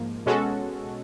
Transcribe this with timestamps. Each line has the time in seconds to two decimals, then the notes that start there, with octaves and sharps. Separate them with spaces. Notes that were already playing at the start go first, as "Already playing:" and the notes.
Already playing: G#2 F3 A#3
0.26 B2 G#3 C#4 F#4 A4